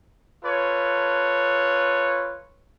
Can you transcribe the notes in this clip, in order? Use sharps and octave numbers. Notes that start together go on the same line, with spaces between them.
F4 A4 B4 C#5